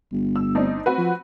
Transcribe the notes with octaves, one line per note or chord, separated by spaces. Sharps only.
G1
E6
C4 D4 D#4
C4 F#4 B4
F3